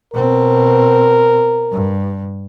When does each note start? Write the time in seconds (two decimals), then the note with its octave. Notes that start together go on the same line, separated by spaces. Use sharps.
0.13 B2 C4 A#4
1.72 G2